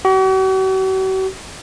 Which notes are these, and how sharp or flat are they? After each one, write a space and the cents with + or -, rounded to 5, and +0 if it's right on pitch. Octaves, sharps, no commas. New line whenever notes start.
F#4 +45